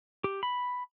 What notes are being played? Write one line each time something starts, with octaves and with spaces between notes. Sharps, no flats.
G4
B5